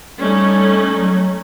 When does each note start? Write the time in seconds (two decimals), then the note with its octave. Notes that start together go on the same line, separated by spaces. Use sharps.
0.20 G3 A3 C#4 D#4
0.96 F#3